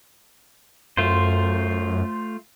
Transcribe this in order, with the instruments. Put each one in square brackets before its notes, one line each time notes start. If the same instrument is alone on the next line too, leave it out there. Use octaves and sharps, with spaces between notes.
[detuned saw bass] F#2 [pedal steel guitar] A3 F4 C5